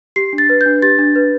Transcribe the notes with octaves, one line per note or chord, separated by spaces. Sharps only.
G4 C7
D4
A6
B4
G6
D4
G4 A6
D4
B4